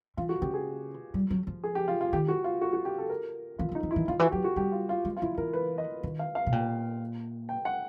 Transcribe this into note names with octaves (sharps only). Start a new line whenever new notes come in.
E3 F4
F#4
C#3 G4
G#4
G3
F#3
F3
G#4
G4
F4
F4
D#3 G4
F#4
F4
F#4
F#4
G4
A4
A#4
E3 F4
E3
D#4
E3
E4
E3
D#3 F4
E3 F#4
F#3 G4
F#4
G3 G4
F4
F4
G#3
F4
F3 E4
E3 A#4
B4
D#5
D#3
F5
F5
B2
A#2 G5
G5
F#5